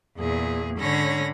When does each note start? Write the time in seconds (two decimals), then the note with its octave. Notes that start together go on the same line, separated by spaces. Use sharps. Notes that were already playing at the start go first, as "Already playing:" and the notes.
0.18 E2 A#2 G#4
0.79 G#2 D3 C#4 C#5 B5 A#6